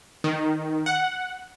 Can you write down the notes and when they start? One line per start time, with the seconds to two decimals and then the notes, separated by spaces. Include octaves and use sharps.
0.24 D#3
0.86 F#5